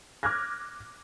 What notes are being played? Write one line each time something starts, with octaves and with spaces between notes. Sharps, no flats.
D6 F6 F#6 G#6 A#6